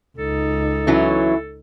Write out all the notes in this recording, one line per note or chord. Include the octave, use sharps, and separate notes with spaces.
C#2 D#4 A4
E3 F#3 C#4 E4